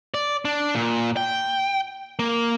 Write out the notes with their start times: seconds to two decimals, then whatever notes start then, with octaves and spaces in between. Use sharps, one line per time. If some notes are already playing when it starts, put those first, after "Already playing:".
0.14 D5
0.45 D4
0.75 A#2
1.17 G5
2.19 A#3